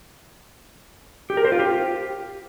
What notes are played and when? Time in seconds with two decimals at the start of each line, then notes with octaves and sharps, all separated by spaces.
1.30 G4
1.37 A#4
1.45 C5
1.52 F4
1.59 G4